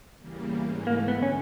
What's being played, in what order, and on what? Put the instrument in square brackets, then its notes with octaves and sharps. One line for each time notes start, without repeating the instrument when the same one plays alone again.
[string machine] E2 C#3 E3 G3 A#3
G#2 E3 A3
[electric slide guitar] A#3
[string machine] F#2 D3 [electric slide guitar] B3
[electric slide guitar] C#4